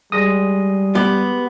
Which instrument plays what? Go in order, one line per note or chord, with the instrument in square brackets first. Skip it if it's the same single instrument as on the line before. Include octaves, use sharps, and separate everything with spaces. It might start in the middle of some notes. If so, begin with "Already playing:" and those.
[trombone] G3 [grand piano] G#3 A#6 [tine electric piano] D#6
[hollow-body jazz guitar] B3 G4